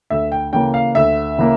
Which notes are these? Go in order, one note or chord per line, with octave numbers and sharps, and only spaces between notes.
D2 E5
G5
C#3 E3 A#3 G5
F5
D2 E5
C#3 E3 A#3